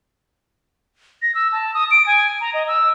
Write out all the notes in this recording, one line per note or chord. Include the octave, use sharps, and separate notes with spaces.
A#6
E6
A5
D#6
D7
G#5
A#5
D#5
E6